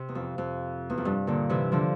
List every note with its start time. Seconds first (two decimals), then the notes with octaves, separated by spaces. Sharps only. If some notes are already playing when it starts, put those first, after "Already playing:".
Already playing: C3
0.09 E2
0.15 F2
0.38 F2
0.90 E2
0.98 F2
1.05 G2
1.27 A#2 D3
1.50 C3 E3
1.72 D3 F3